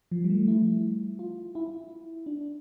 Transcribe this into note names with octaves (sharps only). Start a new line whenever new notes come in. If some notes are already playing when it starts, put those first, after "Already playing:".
F3
G3
A3
E4
F4
E4
D4